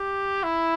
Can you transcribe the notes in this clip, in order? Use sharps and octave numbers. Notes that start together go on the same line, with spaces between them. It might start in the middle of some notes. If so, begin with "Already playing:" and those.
Already playing: G4
E4